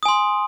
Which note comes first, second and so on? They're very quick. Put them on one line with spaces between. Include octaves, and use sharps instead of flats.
D#6 G#5 C6